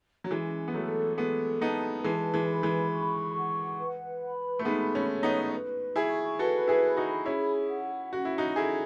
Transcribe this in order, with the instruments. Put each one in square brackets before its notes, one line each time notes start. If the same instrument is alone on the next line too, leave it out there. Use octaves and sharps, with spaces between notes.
[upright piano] F#3
[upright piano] E3 G#3 [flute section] C#4
[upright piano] B3
[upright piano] F#3 A3 [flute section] A4
[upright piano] G#3 B3 [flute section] A4
[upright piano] B3 D#4 [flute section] A5
[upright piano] E3 G#3 [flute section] B4
[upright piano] E3 G#3
[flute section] B5
[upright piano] E3 G#3
[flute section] C#6
F#5
B4
B5
[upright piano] A3
[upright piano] G#3 B3 [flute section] D#4
[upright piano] A3 C#4
[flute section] C#5
[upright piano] B3 D#4
[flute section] B4
[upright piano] E4 G#4 [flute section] C#6
[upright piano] F#4 A4 [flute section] B4
[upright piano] E4 G#4
[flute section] B5
[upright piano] D#4 F#4
[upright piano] C#4 E4 [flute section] G#4
[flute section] F#5
[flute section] C#4 [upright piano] F#4
[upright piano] E4
D#4 F#4
[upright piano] E4 G#4 [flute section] A4